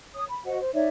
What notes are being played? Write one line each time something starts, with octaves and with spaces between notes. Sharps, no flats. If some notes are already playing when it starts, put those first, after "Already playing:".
C#5 D#6
B5
F#4 C5 D#5 F#5
C5
D#4 C#5 D5 E5